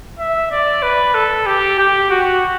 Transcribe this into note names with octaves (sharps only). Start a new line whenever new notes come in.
E5
D5
B4
A4
G4
G4
F#4